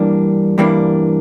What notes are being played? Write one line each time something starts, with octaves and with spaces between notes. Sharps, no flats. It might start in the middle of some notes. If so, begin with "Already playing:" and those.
Already playing: G2 E3 G3 A#3 D4
G2 E3 G3 A#3 D4